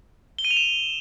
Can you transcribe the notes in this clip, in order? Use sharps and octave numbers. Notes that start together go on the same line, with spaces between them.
G7
D#7
F7
E7